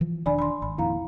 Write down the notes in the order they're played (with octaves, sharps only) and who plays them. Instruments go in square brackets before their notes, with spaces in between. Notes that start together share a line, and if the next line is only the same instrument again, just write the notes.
[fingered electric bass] E3 F3
[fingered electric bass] E1 D#3 D4 [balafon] D5 G#5 B5
[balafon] B5 C6
[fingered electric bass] G#1 [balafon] B5
[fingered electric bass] F2 A#2 D#3 [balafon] E4 F5 A#5